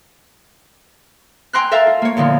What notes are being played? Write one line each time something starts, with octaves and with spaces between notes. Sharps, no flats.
G5 G#5 A#5 C6 E6 F#6
A4 A#4 E5 F5 A5 A#5
F4
A#3 C#5
E2 A#2 D3 F3 B3